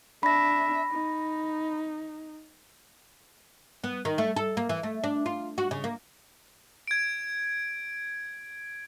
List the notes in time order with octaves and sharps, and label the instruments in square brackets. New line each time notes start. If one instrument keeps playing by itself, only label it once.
[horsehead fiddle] D4 E5 [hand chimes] B5 A#6
[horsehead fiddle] D#4
[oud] B3
D#3
A3
A4
A#3
E3
A3
D4
F4
F#4
C#3
A#3
[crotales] G#6 D7